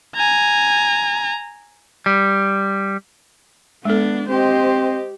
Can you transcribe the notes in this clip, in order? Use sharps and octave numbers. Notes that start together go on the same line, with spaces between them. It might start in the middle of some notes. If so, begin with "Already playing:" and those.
G#5 A#5
G3
G#3 B3 D4 A4
C4 G4 C5 D#5